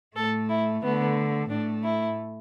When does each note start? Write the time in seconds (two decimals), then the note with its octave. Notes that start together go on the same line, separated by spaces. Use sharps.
0.16 A2 A3 A4
0.50 E4
0.83 D3 A3 B3
1.50 A2 A3 D4
1.84 E4